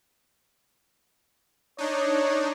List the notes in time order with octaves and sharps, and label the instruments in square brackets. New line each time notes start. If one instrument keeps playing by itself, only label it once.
[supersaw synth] D4 D#4 [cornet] C#5